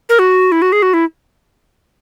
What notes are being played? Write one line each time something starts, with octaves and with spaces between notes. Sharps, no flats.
A#4
F#4
E4
F#4
G#4
F#4
E4